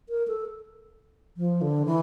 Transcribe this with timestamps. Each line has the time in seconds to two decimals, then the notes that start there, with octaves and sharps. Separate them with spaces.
0.09 A#4
0.28 A4
1.37 F3
1.62 D3
1.86 E3